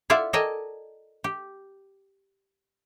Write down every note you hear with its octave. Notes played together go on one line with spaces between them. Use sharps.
E4 F4 D5 E5 F#5
A4 A#4 D5 D#5 G5 G#5
G4